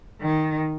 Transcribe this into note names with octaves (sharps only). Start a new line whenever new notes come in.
D#3